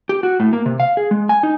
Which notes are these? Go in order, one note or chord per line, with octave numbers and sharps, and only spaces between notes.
G4
F#4
A2
A#3
C3
F5
G#4
G#3
G#5
D#4